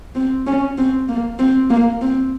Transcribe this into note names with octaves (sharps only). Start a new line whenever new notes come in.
C4
C#4
C4
A#3
C4
A#3
C4